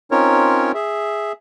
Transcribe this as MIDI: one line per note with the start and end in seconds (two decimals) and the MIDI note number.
0.11 0.72 60
0.11 0.72 61
0.11 0.72 63
0.11 0.72 65
0.11 0.72 70
0.11 0.72 73
0.74 1.32 68
0.74 1.32 76